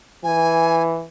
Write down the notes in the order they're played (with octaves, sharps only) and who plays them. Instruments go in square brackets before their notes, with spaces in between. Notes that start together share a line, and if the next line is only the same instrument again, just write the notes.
[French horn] E3 [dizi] G#5